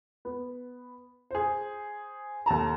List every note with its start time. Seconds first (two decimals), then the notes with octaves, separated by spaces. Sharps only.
0.25 B3
1.31 G#4 C5
2.46 D#2 A4 A5 A#5